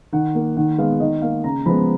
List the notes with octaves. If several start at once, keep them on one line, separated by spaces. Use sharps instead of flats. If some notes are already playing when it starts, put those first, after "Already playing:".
D#3 F#5
A#3
D#3 F#5
G#3 B3 F5
D#3 D#5
A#3 F5
C#3 A#5
F3 G#3 B3 B5